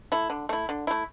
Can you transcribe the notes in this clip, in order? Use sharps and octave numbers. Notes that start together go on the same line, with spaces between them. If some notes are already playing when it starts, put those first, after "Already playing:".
A3 E4
D3
A3 E4
D3
A3 E4